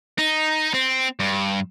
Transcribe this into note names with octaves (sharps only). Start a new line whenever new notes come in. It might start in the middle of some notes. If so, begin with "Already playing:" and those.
D#4
C4
G2